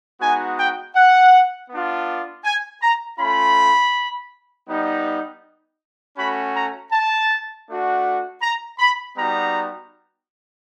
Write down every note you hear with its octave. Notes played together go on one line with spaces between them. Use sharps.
G#3 B3 D#4 F#4 G#5
G5
F#5
B3 D4 F4
G#5
A#5
A3 C#4 F4 B5
G3 B3 D#4
A3 C#4 F#4 B5
A#5
A5
A3 D4 F#4
A#5
B5
G3 B3 D#4 F#4 A#5